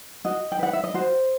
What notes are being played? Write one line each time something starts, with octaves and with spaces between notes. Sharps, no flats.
F#4 D#5
G5
B4 F#5
E5
D#5
F#4 C5